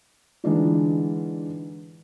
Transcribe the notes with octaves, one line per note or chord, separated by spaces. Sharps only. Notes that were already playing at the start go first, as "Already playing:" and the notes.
D3 E3 G#3 D4 D#4 F4